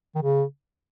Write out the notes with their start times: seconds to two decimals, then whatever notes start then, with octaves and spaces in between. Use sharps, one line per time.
0.15 D#3
0.22 C#3